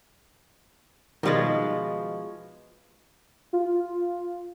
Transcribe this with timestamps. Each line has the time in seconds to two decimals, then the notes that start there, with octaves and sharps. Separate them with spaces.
1.23 B2 D#3 F3 G3 G#3 A6
3.53 F4